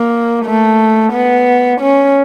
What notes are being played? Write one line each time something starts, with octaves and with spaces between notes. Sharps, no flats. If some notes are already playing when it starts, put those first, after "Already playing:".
Already playing: A#3
A3
B3
C#4